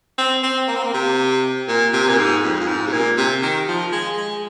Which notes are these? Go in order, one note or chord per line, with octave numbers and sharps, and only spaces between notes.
C4
C4
A#3
C4
A#3
C3
A#2
C3
A#2
G#2
F2
F2
G#2
C3
A#2
C3
D#3
F3
G#3
G#3